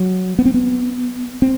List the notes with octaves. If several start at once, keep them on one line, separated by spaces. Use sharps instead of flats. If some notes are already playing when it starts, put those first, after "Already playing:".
Already playing: F#3
B3
C4
B3
C4